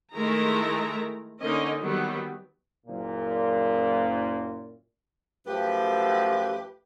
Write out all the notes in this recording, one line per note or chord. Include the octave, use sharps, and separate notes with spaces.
D#3 G#3 A3 E4 A#4 A#5
D3 A#3 C#4 D#4 D#5
D#3 F#3 G3 B3
F#1 A#2
F#2 F3 A3 G4 B4